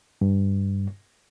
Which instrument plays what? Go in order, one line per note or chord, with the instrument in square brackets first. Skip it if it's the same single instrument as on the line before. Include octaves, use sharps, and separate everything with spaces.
[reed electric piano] G2